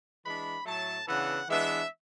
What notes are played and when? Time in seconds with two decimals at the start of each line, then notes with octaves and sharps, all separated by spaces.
0.24 E3 G#3 D4 B5
0.66 A2 F#3 A3 A5
1.07 C#3 E3 B3 D4 F#5
1.48 E3 G#3 B3 D4 E5